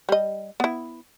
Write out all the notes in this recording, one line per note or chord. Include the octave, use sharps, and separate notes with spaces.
G3 D#5
B3 E4